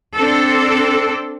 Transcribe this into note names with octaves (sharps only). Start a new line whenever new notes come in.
C4 D4 A4